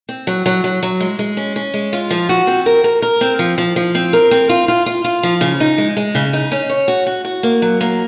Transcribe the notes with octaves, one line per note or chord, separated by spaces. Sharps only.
C4
F#3
F#3
F#3
F#3
G#3
G#3
C#4
C#4
G#3
F4
F3
F#4
C4
A#4
A#4
A#4
C4
F3
F3
F3
C4
A#4
C4
F4
F4
F4
F4
F3
C#3
D#4
G#3
G#3
C#3
D#4
C#4
C#5
F#4
F#4
F#4
A#3
F#3
A#3